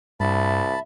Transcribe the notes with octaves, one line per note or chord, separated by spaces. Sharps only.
C2 G2 E5 A5 B5